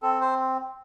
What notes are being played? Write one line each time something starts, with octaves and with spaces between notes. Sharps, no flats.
C4 A4
C5